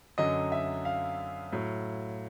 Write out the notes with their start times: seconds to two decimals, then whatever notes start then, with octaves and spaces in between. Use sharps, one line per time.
0.18 F#2 D3 F#3 D#5
0.52 E5
0.85 F5
1.52 A2 F#3